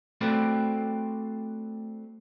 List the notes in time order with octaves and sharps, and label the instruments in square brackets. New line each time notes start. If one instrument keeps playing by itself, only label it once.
[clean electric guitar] A3 C4 F#4 B4 D5 F5